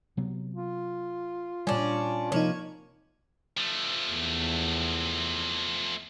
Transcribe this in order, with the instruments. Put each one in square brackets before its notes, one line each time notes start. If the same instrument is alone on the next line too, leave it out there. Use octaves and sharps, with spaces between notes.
[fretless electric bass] C3 F#3 B3
[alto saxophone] F4
[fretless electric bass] A#2 G3 [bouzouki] C#4 D4
[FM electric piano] C3 F3 D#4 [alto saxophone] A#3 [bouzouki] C#5
[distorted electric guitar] F3 A3
[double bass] E2